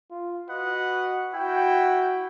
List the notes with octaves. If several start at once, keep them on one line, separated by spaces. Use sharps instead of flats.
F4
F#4 B4 D#5 F#5
E4 F#4 G5